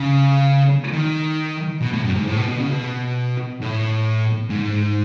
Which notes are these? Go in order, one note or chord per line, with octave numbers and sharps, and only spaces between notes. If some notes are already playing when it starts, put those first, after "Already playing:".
Already playing: C#3
D#3
B2
A2
F#2
G#2
A2
B2
B2
C#3
B2
A2
G#2